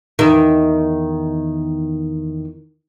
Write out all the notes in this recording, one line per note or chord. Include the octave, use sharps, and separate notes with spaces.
E2 D#3